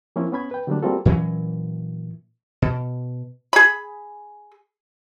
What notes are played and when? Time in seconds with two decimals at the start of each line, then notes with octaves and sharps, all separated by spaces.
0.16 F3 A#3 C4 C#4 E4
0.32 B3 C#4 B5 G#6
0.51 B4 G5
0.67 D3 F#3 G3 A3 A#3 D4
0.83 G3 A#3 C4 F4 F#4 A4
1.05 A#2 E3 F#3 C#4
2.62 B2
3.53 G#4 B5